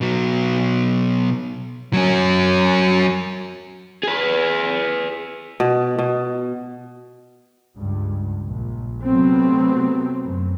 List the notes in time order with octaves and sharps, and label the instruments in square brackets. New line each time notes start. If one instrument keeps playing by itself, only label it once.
[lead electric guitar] B2 F#3
F#3 C#4
[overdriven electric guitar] G#4 B4
[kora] B2
B2
[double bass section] C#2 G2
A#1
C3 F#3 A3 B3 C4
F#2